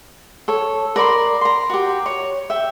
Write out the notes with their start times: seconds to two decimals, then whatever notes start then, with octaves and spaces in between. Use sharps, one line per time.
0.48 A4 C#5
0.96 A#4 D5 B5 C6
1.41 A#5 C6
1.70 F#4 G4
2.06 C#5
2.50 E5 G5